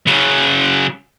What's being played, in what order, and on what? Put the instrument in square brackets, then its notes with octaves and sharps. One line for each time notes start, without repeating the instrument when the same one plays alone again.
[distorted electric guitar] C#3 F#3